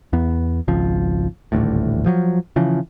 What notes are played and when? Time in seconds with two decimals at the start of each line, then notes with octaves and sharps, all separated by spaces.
0.13 E2 B3
0.68 G#1 C#2 F3
1.52 D#1 A1 D2 A2
2.06 F3 F#3
2.56 C#3 E3 F3